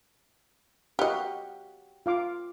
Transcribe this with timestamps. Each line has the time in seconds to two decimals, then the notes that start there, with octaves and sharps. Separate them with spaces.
0.99 F#4 G4 D#5 F5 F#5
2.06 F4 F5 D6